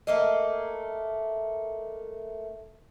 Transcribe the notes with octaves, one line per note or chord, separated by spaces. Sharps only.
A3 A#3 D#5